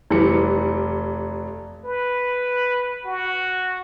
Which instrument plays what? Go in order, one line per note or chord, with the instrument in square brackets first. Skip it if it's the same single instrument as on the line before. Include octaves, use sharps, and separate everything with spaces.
[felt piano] F1 E3 G3 C#7
[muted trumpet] B4
F#4